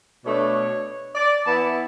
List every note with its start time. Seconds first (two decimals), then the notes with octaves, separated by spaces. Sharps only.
0.25 B2 A3 D4 C#5
1.15 D5
1.45 E3 B3 E4 A5